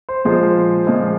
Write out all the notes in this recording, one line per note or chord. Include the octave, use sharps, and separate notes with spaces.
C5
A#2 F3 G#3 C5
A#2 F3 G#3